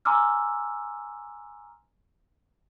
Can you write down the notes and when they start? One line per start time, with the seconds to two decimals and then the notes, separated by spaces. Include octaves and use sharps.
0.05 G#5 A#5 C6 D6 E6 F6